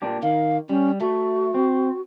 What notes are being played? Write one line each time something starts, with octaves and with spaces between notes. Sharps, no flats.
A#2 D4 G4
D#3 F5
G3 C#4
A3 F#4
C4